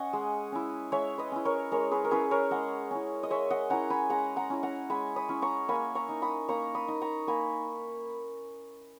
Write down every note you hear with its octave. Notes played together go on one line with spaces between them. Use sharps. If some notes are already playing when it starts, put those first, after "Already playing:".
Already playing: C#4 D#5 F#5 G#5
G#3
C#4 E4
G#3 C#5 E5
B4 D#5
C#4 E4
A#4 C#5
G#3 A#4 C#5
G#4 B4
A#4
C#4 E4 G#4 B4
A#4 C#5
G#3 D#5 F#5
C#4 E4
D#5
G#3 C#5 E5
D#5 F#5
C#4 E4 F#5 A#5
G#5 B5
G#3 F#5 A#5
F#5 A#5
C#4 E4
F#5 A#5
G#3 G#5 B5
B5 D#6
C#4 E4
A#5 C#6
A#3 G#5 B5
A#5 C#6
D#4
B5 D#6
A#3 A#5 C#6
B5 D#6
D#4
A#5 C#6
A#3 G#5 B5